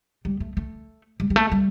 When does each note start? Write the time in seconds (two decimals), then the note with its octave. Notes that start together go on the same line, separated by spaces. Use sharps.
0.25 G3
0.40 A3
0.57 A3
1.20 G3
1.30 G3
1.36 A3
1.52 G3